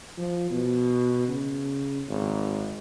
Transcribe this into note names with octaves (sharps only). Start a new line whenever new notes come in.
F3
B2
C#3
G#1